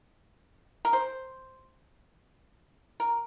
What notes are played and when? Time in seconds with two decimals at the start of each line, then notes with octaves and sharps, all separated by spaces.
0.85 A#4
0.93 C5
3.00 A#4